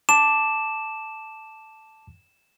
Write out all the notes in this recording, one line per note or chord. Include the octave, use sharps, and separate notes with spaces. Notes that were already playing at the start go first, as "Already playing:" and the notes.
A5 D6 E7